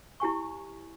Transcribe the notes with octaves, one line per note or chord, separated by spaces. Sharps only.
E4 G4 G#5 C#6